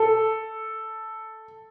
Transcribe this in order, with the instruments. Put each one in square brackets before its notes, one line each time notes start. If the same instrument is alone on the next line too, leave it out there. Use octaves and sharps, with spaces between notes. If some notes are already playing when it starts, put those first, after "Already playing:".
Already playing: [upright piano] A4